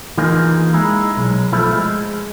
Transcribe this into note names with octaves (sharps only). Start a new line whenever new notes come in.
E3 A#3 D#4 F4 G#4
G#3 D#4 E4
B1
F3 A3 E4
G#3